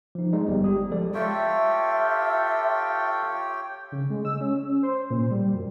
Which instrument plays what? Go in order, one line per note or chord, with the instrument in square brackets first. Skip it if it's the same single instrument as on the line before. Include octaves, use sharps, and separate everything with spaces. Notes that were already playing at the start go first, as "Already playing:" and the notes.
[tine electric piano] F3 D#4
G#3 D#4 D5
G1 G3 B3 G#4
G4 D#6
F3 G#3 A4 D5
[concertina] F4 A4 [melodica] G4 C#5 G5 [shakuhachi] E5
[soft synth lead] C#3
G#3
E6
C#4
C5
A#2
G3
F#2